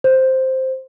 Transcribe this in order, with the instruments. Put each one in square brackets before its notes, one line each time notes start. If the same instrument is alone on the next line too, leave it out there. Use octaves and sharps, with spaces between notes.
[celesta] C5